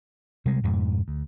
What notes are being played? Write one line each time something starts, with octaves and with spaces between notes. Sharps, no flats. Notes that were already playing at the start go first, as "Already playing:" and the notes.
C3 G3 G#3
F2 G#2 B2
D2